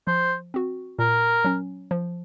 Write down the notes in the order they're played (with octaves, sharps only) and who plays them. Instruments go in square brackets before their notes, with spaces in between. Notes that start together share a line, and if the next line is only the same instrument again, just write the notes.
[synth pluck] F3 [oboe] C5
[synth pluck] C4 F#4
[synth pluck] A#2 [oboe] A#4
[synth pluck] F#3 C#4
F3